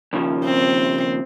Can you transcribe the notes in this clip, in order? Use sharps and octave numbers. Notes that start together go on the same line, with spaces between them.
D#2 C#3 F3
C4